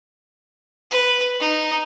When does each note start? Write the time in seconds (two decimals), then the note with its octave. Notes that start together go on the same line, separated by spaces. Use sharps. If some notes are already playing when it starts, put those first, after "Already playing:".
0.91 B4
1.40 D#4